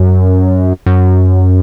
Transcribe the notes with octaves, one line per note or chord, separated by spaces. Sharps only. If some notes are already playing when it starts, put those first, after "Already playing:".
Already playing: F#2
F#2